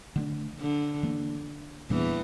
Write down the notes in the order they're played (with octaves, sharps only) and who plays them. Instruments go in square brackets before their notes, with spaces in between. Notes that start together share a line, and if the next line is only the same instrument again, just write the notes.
[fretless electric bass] D3 A3 D4
[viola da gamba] D3
[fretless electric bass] E3 A#3 D4
[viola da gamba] E2 E3 [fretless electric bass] A#2 G3 A#3 D4